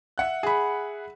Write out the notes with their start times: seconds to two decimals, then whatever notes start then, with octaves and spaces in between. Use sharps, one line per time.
0.18 E5 F#5 F#6
0.43 G#4 B5